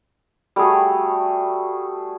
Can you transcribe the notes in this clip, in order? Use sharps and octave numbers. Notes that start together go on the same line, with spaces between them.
G3 A3 F#4 G#4